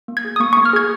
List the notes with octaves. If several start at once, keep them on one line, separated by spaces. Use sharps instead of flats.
A#3
G#6
G#4
D#6
A#3 C#6
A#3 C#6
F6
G#4 G#6